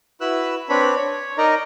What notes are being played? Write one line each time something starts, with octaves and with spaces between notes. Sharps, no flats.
E4 F#4 B4 E6 F#6
C4 D4 B4 C#5 B5
C#5
D#4 A#4 D5 D#5 A#5